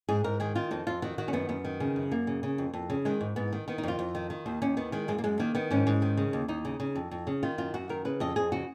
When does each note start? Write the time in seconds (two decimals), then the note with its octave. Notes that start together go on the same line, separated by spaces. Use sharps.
0.09 G#2 G#4
0.24 G#2 A#4
0.40 D#3 G#4
0.55 D#3 F4
0.71 F2 D#4
0.87 F2 F4
1.02 D#3 F#4
1.18 D#3 F#4
1.28 C#4
1.33 F#2 B3
1.49 F#2 B3
1.65 D#3
1.80 C#3
1.96 F#2
2.11 F#2 A#3
2.27 C#3
2.43 C#3
2.58 F2
2.74 F2
2.90 C#3
3.05 D#3 G#3
3.21 G#2
3.36 G#2 B3
3.53 D#3
3.68 D#3 B3
3.78 D#4
3.83 F2 F4
3.99 F2
4.15 D#3
4.30 D#3
4.46 D#2
4.62 D#2 C#4
4.77 D#3 B3
4.92 D#3 G#3
5.08 F#2 G#3
5.18 A#3
5.24 F#2 G#3
5.40 D#3 A#3
5.55 D#3 B3
5.71 G#2 C#4
5.87 G#2
6.02 D#3
6.17 C#3
6.33 D#2
6.48 D#2 D#4
6.65 C#3
6.80 C#3
6.95 F2
7.11 F2
7.27 C#3
7.43 D#3 F4
7.58 F#2 F4
7.74 F#2 F#4
7.89 D#3 A#4
8.05 C#3 B4
8.20 F2 D#5
8.36 F2 G#4
8.52 C#3 F#4